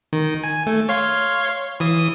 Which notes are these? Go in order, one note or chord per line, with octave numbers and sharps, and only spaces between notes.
D#3
G#5
A3
C#5 F5 C6
E3 D#6